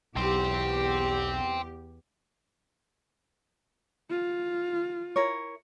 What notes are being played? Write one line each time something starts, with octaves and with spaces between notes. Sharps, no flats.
B1 E2 G4 G5 C6
F4
E4 A#4 C#5